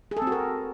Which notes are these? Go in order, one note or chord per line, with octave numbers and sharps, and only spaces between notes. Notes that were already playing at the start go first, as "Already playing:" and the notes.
G#4
A4
C4
F#4
A#4